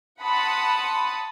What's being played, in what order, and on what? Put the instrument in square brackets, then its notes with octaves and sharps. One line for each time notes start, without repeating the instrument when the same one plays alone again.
[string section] F#5 A5 B5 C6 D#6